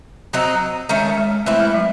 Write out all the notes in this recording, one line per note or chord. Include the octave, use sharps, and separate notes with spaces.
F#3 C4 D#4 F#4
D#3 G#3 A3 C#4
G#3
G#3
G#3
E3 A3 C4 E4
G#3
F#3